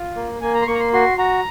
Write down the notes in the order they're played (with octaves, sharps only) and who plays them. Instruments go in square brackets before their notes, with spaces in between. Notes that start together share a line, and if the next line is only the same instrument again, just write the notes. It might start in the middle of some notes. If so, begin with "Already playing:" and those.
Already playing: [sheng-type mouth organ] F4
A#3
A#3 G#5
A#5
C6
A#3 C#6
A#5
C6
F#4 C6
F#4 A#5